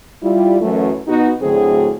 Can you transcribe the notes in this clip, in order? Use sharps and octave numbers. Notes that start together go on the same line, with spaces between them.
G3 E4 F4
F#2 E3 A3
B2 B3 D#4 F#4
D2 A2 D3 F#3 C4 G#4